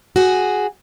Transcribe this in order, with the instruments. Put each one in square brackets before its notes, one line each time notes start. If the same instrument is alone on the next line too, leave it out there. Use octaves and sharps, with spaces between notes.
[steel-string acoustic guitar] F#4 G#4